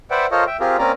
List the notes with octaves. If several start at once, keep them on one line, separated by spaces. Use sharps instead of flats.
B4 C5 D5 E5 F#5 G5
F4 A4 A#4 C5 C#5 D#5
E5 G5
C4 F4 G4 G#4 A#4
A#3 C4 C#4 A#4 D5 A#5